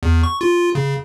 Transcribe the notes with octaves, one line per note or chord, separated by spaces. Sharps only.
E2
C#6
F4
C#3